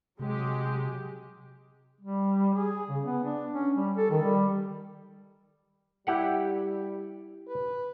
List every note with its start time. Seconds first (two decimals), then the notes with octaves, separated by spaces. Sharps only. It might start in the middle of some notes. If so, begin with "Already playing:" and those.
0.19 C3 F#3 G#3 G4
2.00 G3
2.55 G#4
2.89 C#3
3.03 B3
3.24 D4
3.52 C#4
3.75 G3
3.97 A4
4.10 D#3
4.22 G3
6.07 G3 E4 G4 F#5
7.47 B4